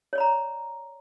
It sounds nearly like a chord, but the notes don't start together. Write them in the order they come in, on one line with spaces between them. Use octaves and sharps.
C#5 D5 B5 A#5